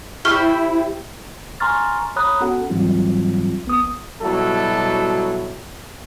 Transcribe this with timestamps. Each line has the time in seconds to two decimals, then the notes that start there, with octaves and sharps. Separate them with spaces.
0.25 E4 G4 C5 E5 C#6 F6 G7
1.60 G#5 A#5 C6 C#6 F6 A6
2.16 C#5 A#5 B5 D#6 F#6
2.41 B3 C#4 F#4 A4 F#5
2.70 G#2 E3 F#3 G3 C4 F4
3.65 A#1 B3 D#6
4.22 B2 F#3 G3 E4 A4